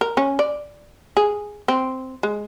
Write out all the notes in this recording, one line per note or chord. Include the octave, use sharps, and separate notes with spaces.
A#4
C#4
D5
G#4
C4
G#3